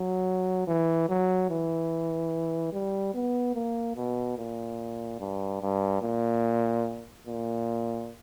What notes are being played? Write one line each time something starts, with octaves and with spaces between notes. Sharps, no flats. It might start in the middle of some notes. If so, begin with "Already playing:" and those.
Already playing: F#3
E3
F#3
E3
G3
B3
A#3
B2
A#2
G2
G2
A#2
A#2